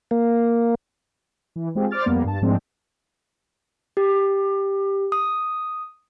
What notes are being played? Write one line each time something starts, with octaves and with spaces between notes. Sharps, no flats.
A#3
E3
G#3 C4 F4 G4 G#4
C5 D5 D6 F6 A6
F2 G3 A#3 B3
G2 A5
G#2 F3 G#3 A3 C4 D4
G4
D#6